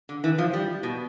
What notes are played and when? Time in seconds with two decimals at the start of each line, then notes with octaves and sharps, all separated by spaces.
0.09 D3
0.24 E3
0.38 F3
0.53 G3
0.83 B2